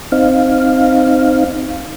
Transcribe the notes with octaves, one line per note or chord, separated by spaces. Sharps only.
C4 D#4 F5